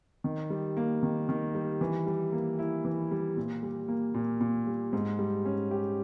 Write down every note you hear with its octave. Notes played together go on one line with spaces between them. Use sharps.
D#3
G3
A#3
D#3
D#3
G3
E3
G3
A#3
E4
E3
G3
A#2
G3
A#3
A#2
A#2
G3
G#2
G3
C#4
G4